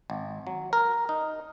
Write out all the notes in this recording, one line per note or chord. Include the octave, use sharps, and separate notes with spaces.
G#1
F#3
A#4
D#4